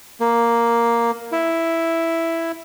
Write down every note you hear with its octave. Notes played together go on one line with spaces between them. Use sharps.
A#3
E4